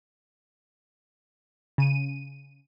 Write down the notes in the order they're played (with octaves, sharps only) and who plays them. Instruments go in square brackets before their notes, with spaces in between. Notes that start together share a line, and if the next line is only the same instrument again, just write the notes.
[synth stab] C#3 D#7